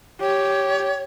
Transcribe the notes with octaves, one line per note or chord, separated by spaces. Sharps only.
G4 C#5